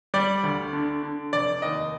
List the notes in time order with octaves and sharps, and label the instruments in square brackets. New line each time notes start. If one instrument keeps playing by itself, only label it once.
[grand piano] G3 D5
D2
D3
D3
F1 D5
D#2 D#5